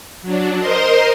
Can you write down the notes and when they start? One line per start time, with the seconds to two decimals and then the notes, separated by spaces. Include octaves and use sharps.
0.22 F#3 D4
0.59 A#4 C5 D#5 C6